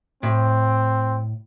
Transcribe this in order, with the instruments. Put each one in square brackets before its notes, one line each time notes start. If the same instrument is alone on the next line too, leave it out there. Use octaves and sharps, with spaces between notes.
[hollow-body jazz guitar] A2 [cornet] C4